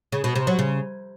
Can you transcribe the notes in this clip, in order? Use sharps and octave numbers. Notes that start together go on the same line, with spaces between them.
C#3
B2
C3
F#3
C#3